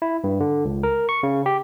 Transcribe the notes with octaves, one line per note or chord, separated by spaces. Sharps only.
E4
G2
D3
C#2
A#4
C#6
C#3
G4